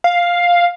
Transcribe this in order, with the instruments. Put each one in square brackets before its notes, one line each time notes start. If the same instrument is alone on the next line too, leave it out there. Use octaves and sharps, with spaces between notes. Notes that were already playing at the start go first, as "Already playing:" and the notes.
[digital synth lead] F5